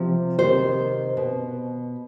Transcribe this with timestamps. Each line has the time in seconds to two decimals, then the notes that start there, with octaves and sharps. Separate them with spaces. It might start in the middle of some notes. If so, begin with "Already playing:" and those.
Already playing: C3 F3
0.39 C3 D#3 C5
1.17 B2